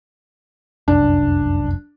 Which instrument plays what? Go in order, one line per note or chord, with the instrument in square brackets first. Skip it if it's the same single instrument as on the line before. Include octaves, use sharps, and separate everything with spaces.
[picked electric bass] F1 C2 F#2 [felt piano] D4